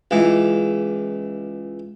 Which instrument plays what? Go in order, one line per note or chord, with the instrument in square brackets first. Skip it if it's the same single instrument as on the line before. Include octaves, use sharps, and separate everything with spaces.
[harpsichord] C#2 E3